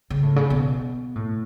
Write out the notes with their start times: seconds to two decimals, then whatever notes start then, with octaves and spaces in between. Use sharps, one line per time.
0.10 C#3
0.23 A2
0.36 C#3
0.50 B2
1.15 A2